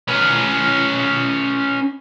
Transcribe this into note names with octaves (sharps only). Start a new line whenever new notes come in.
C#4 B4